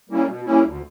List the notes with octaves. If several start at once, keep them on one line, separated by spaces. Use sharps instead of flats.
G3 A#3 C#4 E4
B2
G3 A#3 C#4 E4
D2